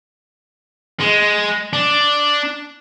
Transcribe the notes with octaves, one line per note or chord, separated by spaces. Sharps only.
G#3
D4